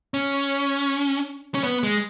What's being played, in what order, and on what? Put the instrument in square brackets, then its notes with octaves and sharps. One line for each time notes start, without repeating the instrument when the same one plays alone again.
[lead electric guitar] C#4
C#4
B3
G#3